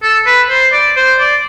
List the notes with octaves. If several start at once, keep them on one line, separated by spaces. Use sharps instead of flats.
A4
B4
C5
D5
C5
D5